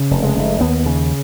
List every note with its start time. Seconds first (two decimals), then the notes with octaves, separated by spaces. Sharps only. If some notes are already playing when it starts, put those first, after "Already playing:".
Already playing: C#3
0.11 F1
0.23 G#3
0.36 F1
0.61 D#2 B3
0.86 C#3